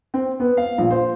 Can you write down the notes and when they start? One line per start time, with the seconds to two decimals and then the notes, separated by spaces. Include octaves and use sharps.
0.14 C4
0.40 B3
0.57 F5
0.78 A#1
0.90 C5